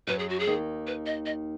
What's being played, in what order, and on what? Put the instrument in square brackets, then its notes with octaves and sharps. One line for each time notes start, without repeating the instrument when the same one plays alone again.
[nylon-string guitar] F#2 F#3 [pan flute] B4
[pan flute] G#4
F#4
G#4
[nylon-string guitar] D#2 D#3
[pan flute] B4
D#5
D#5